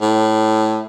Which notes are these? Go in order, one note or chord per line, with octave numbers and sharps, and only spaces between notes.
A2